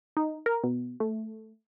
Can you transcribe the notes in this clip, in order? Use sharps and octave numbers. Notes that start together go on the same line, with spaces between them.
D#4
A#4
B2
A3